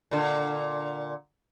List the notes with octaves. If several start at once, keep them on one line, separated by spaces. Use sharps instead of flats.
A#2 D3